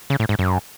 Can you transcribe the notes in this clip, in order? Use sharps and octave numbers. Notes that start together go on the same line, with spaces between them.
C#3
A2
G#2
F#2